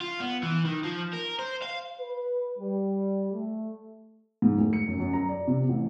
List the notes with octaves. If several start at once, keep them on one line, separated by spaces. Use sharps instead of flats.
F4
B3
E3
D#3
F3
A#4
C5
F5
B4
G3
A3
G#2
D1
C#7
F#2
F#2
A#5
D5
C3
A1